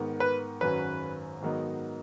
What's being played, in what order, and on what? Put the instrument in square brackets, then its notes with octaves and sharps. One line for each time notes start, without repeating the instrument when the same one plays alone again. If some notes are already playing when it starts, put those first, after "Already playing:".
Already playing: [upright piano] G#2 D#3 B3
[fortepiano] B4
[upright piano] G#1 F#2 F#3 C#4 [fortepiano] B4
[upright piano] G#2 D#3 F#3 B3 D#4